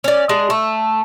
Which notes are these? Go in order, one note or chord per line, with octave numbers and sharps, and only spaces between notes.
C#4 D5
G#3 D4 G#4
A3